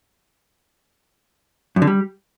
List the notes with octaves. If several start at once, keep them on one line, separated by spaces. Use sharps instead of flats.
F#2
D3
G3